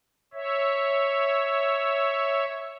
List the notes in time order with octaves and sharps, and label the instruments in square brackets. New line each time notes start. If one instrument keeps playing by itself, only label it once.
[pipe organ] C#5 E5